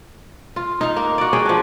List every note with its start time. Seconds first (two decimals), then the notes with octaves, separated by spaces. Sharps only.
0.56 F4
0.81 D#4 F5
0.96 A#3
1.18 F#4 D5
1.33 C#4 G#4 D#5 G5
1.46 F3 D4